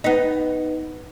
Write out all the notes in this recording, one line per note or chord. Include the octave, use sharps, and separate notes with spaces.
B3 D#4